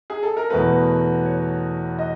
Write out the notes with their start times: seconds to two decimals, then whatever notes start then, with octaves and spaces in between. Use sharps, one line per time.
0.10 G#4
0.23 A4
0.37 A#4
0.50 E2 B2 F#3 A3 B4
1.25 C#5
1.99 D#5